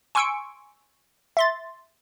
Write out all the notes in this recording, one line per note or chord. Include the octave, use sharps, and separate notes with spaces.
G#5 C6 C#6 E6 C#7 D7
E5 C6 A6